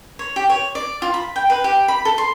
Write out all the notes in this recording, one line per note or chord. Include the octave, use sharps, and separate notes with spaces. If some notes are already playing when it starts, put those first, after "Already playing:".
C#5
G4
C#5
D5
F4
B5
G5
B4
G4
B5
A4
C6